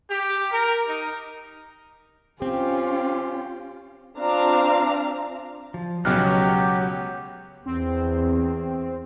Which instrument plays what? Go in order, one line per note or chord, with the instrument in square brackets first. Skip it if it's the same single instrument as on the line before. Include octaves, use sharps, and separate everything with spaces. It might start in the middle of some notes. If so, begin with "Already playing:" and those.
[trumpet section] G4
A#4
D#4
[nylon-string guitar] C4 [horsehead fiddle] C#4 F4 [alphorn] G4
[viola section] C4 D4 F4 F5 A#5
[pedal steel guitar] F3
[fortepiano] C#2 B2 F#6 [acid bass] F#3 [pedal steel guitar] D#4 F6 [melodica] G4
[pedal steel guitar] C#5
[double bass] E2 [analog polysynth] C4